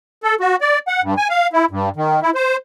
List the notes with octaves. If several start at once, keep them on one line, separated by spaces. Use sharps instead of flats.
A4
F#4
D5
F#5
G2
G#5
F5
E4
G2
D#3
E4
C5